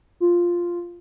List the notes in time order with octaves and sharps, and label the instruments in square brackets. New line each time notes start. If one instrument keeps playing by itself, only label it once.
[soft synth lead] F4